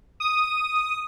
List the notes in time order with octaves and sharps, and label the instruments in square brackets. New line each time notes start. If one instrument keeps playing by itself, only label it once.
[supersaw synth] D#6